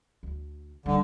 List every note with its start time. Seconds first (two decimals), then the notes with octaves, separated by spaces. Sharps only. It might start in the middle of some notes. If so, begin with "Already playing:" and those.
0.23 D2
0.86 D3 G3 A#3